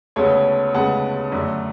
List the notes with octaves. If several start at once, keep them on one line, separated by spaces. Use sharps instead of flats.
D2 C#3 G#3 B3 A4 C#5
D2 C#3 G#3 B3 F#5 A5
F#2 D3 A3